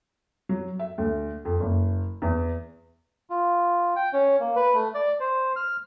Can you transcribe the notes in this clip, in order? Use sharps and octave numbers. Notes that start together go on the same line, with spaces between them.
F#3
E5
D2
F2
F#1
E2
F4
G5
C#4
A#3
B4
A3
D5
C5
F6